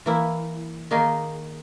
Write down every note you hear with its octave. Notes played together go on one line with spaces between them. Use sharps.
E3 A#3 E4
D#3 A#3 D#4 G#4